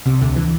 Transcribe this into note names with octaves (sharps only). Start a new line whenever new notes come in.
C2 C3
D2 D3
E3